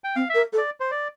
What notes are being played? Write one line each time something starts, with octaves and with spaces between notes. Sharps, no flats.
G5
C4 F5
A#4 E5
A4
D5
C5
D5